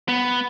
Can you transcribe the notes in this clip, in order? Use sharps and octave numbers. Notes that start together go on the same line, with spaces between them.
B3